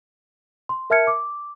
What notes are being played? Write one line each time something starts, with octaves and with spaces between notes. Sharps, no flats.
C6
A#4 E5 A5 F6 G#6 C#7
D6